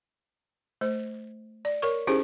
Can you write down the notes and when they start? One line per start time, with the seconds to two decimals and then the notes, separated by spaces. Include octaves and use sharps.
0.81 A3 C5
1.65 D5
1.82 A#4 C#5 C#6
2.07 C#4 D#4 E4 G4 G#4 C5